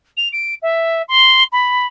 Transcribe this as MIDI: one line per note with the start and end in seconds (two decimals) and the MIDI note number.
0.17 0.28 101
0.32 0.55 98
0.62 1.02 76
1.08 1.43 84
1.52 1.86 83